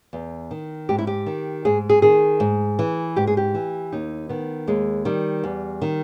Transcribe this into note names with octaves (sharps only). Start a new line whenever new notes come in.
E2
D#3
G#2 G4
E4
G4
D#3
G#2 G#4
G#4
D#3 G#4
G#2
E3
G#2 G4
G#4
G4
E3
D#2 D#4
D#3 B3
D#2 G#3
D#3 G3
E2
D#3